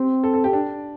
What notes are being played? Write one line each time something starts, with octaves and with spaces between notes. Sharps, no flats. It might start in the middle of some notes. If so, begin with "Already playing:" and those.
Already playing: C4 G4
A4
A4
G4
D4